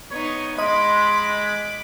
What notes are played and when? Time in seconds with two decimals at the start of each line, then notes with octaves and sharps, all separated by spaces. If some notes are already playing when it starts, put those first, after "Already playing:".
0.11 B3 D#4 C#5
0.58 G#3 D#5 B5 C6 D6